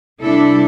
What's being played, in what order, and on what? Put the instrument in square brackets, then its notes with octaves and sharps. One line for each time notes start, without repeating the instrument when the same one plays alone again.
[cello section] C3 G3 D4 E4 A4